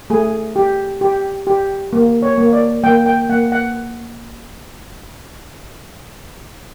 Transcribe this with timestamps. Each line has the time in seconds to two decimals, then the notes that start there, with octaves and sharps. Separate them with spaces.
0.10 A3 G#4
0.56 G4
1.01 G4
1.47 G4
1.93 A#3
2.22 C#5
2.38 A#3
2.53 D5
2.84 A#3 G5
3.06 G5
3.29 A#3 F#5
3.52 F#5